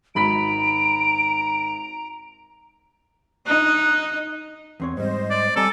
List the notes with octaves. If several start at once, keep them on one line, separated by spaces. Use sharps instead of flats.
G#1 A#5 B5 B6 D7
D#4 F#6
E2 C4 C#5
G#2 G3 C5 D#5
D5
G3 C4 A4 G#5 A#5